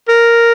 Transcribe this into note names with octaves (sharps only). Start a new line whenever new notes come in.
A#4